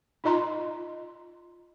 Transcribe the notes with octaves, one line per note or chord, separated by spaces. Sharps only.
D#4 F4 D#5 A#5 C6